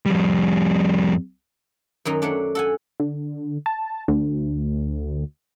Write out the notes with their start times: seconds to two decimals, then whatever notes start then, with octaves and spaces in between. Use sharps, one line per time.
0.06 F2 G3
2.05 F#2 D#3 F#3 D#4
2.22 A3 D4 C#5 F#5
2.55 A4 F#5 G#5
3.00 D3
3.66 A5
4.08 D2